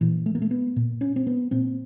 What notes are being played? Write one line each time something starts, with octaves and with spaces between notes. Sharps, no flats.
A#2 E3
A3
A#3
A3
B3
A#2
C#4
C4
B3
A#2 C4